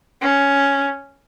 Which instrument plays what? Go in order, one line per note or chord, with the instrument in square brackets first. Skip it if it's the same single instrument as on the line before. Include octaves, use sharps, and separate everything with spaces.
[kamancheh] C#4